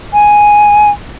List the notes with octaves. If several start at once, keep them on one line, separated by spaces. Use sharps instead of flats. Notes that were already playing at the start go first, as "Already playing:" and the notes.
G#5